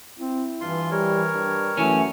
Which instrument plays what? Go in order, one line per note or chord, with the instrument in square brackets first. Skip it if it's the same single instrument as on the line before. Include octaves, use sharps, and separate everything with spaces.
[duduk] C4 [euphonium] E4
[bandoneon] G2 F4 C6 [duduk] E3
[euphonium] G3 [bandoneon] A#4 C#5
[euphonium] G2
[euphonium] F#2 [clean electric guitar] E3 C#4 [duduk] A3